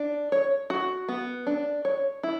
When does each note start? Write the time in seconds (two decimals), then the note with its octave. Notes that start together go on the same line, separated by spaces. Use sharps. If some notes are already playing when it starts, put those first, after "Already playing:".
Already playing: D4
0.32 C#5
0.70 F#4
1.08 B3
1.47 D4
1.85 C#5
2.23 E4